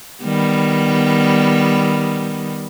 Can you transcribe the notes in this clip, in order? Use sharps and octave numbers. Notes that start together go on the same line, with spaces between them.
D#3 G3 B3